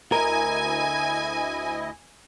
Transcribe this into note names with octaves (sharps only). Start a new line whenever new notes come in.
D2 E4 A#4 D#5 G#5